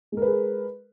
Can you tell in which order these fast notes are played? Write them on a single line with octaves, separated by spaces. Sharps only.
G#3 A#4 B4 G#4